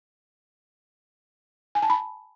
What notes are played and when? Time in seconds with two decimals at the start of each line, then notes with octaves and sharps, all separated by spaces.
1.75 G#5
1.82 A5
1.90 B5